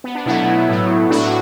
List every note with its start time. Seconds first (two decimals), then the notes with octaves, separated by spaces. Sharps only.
0.04 B3
0.15 D4
0.26 B2 F#3 A3 B3 E4
0.68 A2 F#3 A3
1.10 A2 A3 D4 F#4